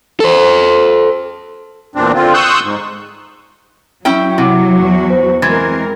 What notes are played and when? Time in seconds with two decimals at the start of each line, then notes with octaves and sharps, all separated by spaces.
0.20 A4 C5
1.95 E2 A#2 C4 D4
2.14 D3 C4 F4
2.34 C6 C#6 D#6 E6 F#6 G6
2.64 G#2
4.05 F#3 C#4 E4 G5
4.38 C3 E4 F#5 D6
4.76 E2 F#4
5.10 C5
5.42 E3 G#3 C4 A#4 C6 G#6 A6